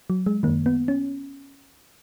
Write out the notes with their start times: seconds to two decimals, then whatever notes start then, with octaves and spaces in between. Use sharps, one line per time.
0.10 F#3
0.26 G#3
0.43 F#2 D#3 A#3
0.66 B3
0.88 C#4